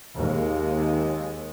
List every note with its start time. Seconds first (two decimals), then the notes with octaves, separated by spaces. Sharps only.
0.16 D#2 G#3